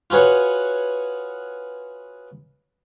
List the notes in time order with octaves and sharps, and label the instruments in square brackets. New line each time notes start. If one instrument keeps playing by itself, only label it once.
[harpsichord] F4 F#4 G#4 B4 C#5